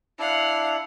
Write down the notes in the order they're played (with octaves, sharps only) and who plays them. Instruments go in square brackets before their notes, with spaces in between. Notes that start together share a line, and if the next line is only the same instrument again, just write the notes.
[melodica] D4 E4 [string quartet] F5 F#5